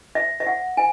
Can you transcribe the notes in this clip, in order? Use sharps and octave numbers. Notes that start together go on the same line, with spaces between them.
E5
E5
F#5
G#5